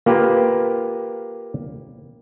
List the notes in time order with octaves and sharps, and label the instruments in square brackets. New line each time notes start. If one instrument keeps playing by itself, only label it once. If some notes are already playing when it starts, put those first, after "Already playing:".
[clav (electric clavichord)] A#3 F4 G4 B4